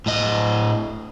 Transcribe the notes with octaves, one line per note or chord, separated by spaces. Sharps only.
A2 D#5